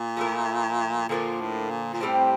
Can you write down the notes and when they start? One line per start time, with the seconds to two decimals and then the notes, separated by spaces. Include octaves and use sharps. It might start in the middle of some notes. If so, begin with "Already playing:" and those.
Already playing: A#2
0.17 F3 A3 E4 A#4
1.09 A#2 D3 F3 A#3 F4
1.40 A2
1.70 A#2
1.94 A#2
2.01 A2 G3 C4 G4 C5